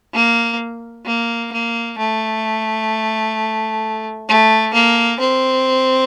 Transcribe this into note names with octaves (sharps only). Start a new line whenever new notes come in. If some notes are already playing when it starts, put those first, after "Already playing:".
A#3
A#3
A#3
A3
A3
A#3
C4